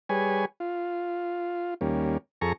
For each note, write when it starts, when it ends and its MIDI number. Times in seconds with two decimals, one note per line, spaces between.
0.09 0.45 55
0.09 0.45 68
0.09 0.45 71
0.09 0.45 73
0.09 0.45 80
0.60 1.74 65
1.81 2.18 39
1.81 2.18 55
1.81 2.18 58
1.81 2.18 61
2.41 2.53 41
2.41 2.53 68
2.41 2.53 69
2.41 2.53 82
2.41 2.53 85